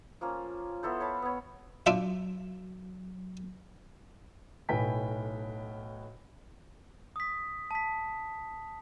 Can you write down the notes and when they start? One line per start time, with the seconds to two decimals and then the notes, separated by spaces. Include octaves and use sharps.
0.21 F3 A#3 C#4
0.83 B3 E4 A4 C5
1.00 C#5 F5 A5 B5
1.22 B3 C#5
1.86 F#3 D4 F4 E5
4.69 B1 A2 B4 G5 G#5 B6
7.16 D#6 B6
7.71 A5 B6